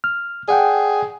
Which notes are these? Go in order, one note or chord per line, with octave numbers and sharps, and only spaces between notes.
F6
G#4 D5 F#5 G5